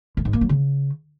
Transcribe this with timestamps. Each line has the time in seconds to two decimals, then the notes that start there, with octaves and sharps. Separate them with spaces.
0.17 A2
0.25 G#2
0.33 A#3
0.41 F#3
0.49 C#3